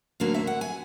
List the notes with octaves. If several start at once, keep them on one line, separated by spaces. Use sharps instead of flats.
D2 D3 F#3 A#3 F5
E5
F#5
G#5